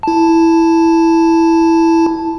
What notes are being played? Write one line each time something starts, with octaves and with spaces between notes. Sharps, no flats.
E4 A5